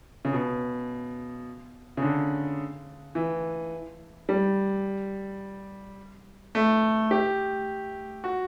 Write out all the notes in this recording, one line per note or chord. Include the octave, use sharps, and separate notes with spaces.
C#3
B2
C#3
D3
E3
G3
A3
G4
F#4